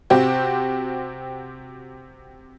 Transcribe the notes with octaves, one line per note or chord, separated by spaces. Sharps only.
C3 C4 F#4 G4